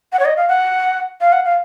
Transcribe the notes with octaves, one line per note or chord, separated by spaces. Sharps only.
F#5
C#5
D#5
F5
F#5
F5
F#5
F5